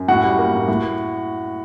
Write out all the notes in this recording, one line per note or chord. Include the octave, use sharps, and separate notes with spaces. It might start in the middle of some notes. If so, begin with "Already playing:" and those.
Already playing: F#2
A2 F#4 F#5
G3
A#3
A2
A2